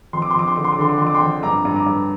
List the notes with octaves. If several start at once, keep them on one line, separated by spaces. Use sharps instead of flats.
F2 C6
D6
C6
F2 D6
C6
D3 D6
C6
D6
D3 C6
D6
F2 C6
D6
G5 C6
F2
G2 A#5 D6
G2
A#5 D6
G2